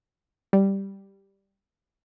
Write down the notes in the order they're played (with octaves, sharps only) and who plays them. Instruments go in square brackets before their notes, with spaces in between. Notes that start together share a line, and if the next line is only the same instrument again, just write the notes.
[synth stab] G3